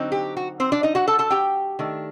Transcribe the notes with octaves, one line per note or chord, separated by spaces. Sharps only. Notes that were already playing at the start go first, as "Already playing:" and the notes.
Already playing: D3 F#3 C4 D#4
G4
F#4
C4 C5
D4 D5
D#4 D#5
F#4 F#5
A4 A5
A4 A5
G4 G5
D#3 A3 D4